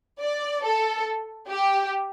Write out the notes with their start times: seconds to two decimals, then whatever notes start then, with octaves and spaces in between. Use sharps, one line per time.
0.21 D5
0.64 A4
1.49 G4